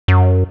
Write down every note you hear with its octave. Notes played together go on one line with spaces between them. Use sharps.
F#2